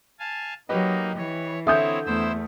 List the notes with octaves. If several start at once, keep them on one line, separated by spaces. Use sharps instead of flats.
F5 G#5 A5
F#3 A#3 D#4 G4 B4 D#5
E3 C#5
D3 C4 E4 C#5 E5 D#6 G6
E2 A3 E4 C5 E6